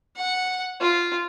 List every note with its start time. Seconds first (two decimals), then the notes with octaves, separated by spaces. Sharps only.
0.16 F#5
0.80 F4